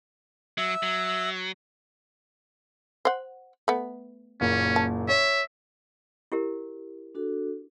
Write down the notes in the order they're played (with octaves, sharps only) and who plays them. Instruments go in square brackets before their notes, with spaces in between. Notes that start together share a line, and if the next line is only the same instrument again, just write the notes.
[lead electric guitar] F#3 [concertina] E5
[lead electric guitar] F#3
[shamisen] C5 F#5
A3 B3
[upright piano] F#1 A#2 [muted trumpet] C#4
[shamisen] A5
[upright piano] C#5 [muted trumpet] E5
[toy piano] E4 G4 A#4
[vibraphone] D4 F#4 A4